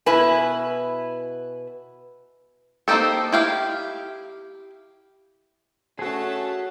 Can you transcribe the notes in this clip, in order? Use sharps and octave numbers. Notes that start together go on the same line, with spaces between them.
B2 E4 B4 G#5
A#3 C4 D#4 G4 A4
E4 G4 F5
A3 C#4 F#4 G#4 A5